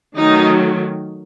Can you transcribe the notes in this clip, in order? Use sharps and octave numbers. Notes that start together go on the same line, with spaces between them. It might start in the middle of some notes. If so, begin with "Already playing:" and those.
D#3 F#3 A3 D#4